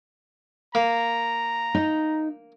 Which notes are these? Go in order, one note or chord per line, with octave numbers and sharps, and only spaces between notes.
A#3 A#5
D#4